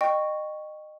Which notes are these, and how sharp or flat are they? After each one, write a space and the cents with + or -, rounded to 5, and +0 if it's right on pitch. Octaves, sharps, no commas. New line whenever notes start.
D#5 -25 G5 +0 C#6 +0